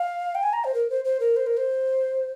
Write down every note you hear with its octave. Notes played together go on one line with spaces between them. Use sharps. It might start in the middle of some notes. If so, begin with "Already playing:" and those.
Already playing: F5
G5
G#5
A#5
C5
A#4
C5
C5
A#4
C5
A#4
C5